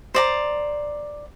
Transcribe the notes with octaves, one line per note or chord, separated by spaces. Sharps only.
C5 D5 A#5